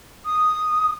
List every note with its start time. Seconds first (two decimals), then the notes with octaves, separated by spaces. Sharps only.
0.25 D#6